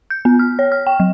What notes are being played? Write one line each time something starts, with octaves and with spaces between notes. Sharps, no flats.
G6
B3
F6
C#5
F6
G5
F#3